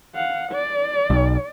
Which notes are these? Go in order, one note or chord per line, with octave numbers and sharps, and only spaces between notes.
F5 F#5
D5
B1